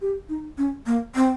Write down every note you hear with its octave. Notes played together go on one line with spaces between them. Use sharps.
G4
D#4
C#4
A#3
C4